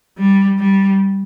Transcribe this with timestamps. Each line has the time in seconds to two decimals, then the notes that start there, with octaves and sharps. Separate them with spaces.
0.18 G3
0.59 G3